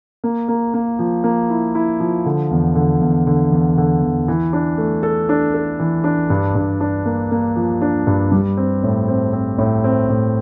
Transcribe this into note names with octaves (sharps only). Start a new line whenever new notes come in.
A#3
A#3
A#3
F3
A#3
E4
E4
F3
D3
E2
D3
E2
D3
E2
D3
E2
E3
D4
A3
A4
D4
A4
E3
D4
G2
G2
D4
A#3
A#3
F3
D4
G2
G3
C4
A2
C4
C4
A2
C4
A2